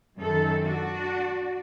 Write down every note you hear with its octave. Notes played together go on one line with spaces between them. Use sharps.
F#2 D#3 A4
D4 F#4